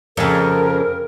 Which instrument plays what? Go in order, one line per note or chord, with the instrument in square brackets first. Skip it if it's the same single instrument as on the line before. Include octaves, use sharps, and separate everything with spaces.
[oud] F2 C#3 [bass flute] A#4